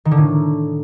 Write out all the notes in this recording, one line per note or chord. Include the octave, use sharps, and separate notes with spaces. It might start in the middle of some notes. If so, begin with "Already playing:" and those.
D#3
D3
A2